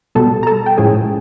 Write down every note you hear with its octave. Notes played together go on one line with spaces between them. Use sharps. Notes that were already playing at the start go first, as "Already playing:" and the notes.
B2 G3 B3 A4 A5
A#5
A4 A5
G5
A2 F3 G#3 C#4 G#4 G#5